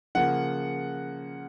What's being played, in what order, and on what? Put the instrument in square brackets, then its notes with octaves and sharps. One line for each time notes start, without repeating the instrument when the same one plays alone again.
[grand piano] C#3 F3 A#3 F#5